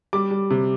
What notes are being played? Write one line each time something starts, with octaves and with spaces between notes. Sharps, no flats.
G3 D6
G3
C3